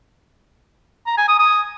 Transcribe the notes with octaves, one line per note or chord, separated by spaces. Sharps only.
A#5
G#5
D#6
D#6